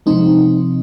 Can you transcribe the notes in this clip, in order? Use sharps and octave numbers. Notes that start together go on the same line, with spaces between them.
C3 F3 G#3 C4 D#4